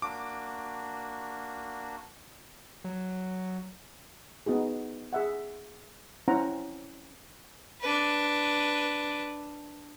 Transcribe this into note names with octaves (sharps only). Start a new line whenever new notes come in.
A#3 D4 F#4 D6
F#3
B3 D#4 F#4 G#4
G#4 E5 F#5
C4 C#4 E4 C5 F#5 A#5
D4 B4